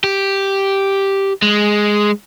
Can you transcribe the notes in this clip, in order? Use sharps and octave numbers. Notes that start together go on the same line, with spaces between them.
G4
G#3